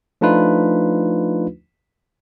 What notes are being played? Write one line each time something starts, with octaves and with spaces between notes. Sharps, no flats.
F3 A3 D4 D#4 F4 B4